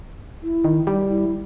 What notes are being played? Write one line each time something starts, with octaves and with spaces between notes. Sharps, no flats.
E4
D#3
G3
E4